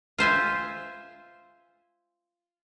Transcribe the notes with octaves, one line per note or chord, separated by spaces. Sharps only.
F4 C5 E5 G#5